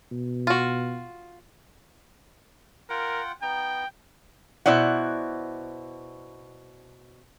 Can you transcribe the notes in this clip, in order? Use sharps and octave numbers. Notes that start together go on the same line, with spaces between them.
B2
F4 F#4
F4 A#4 F#5 G5
B3 D#4 G5 A#5
B2 E4 C5 D5 F#5